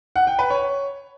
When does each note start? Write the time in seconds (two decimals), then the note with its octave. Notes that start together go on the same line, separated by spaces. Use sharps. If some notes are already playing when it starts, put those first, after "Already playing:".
0.16 F#5
0.27 G5
0.39 B4
0.50 C#5